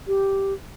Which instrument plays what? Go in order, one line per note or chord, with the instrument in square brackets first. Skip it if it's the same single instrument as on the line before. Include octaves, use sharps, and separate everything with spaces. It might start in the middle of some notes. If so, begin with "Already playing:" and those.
[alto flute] G4